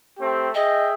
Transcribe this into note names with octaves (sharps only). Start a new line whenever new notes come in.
A3 C4 G4
G#4 D#5 E5 G5